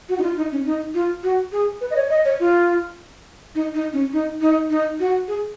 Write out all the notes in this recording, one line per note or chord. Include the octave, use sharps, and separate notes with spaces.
F#4
D#4
F4
D#4
C#4
D#4
F4
F#4
G#4
B4
D#5
C#5
D#5
C#5
F4
D#4
D#4
C#4
D#4
D#4
D#4
F#4
G#4